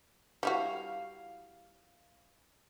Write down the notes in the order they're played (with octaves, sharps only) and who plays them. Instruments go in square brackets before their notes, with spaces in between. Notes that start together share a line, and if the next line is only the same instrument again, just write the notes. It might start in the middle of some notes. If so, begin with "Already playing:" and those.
[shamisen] G3 E4 F#4 [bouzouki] F5